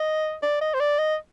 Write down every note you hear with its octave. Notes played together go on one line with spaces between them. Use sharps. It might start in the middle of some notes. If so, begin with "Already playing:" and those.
Already playing: D#5
D5
D#5
C5
D5
D#5